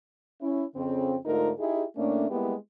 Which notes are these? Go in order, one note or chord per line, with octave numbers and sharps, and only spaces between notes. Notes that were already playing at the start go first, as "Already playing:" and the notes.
C#4 E4
F2 C#3 C4
G#2 D3 A3 D#4 F4 A#4
D#4 E4 G4 G#4
A2 A3 A#3 C#4 D4
G3 G#3 A#3 B3 E4 G4